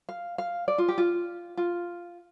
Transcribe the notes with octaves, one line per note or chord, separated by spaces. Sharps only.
F5
F5
D5
F4
G4
F4
F4